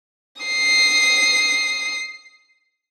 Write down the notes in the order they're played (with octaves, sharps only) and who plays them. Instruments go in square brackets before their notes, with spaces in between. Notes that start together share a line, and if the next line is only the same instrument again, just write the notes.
[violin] D#6 C7